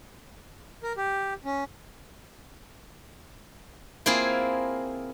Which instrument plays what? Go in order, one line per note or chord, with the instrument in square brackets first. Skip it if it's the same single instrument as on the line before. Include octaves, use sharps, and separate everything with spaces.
[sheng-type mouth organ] A#4
G4
C#4
[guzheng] A#3 C4 E4 F4 G#4